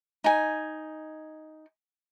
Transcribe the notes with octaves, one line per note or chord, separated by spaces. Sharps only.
D#4 G#5